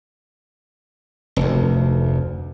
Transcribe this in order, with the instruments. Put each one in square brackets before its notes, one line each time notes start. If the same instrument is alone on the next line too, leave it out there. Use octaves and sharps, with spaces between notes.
[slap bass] F1 D2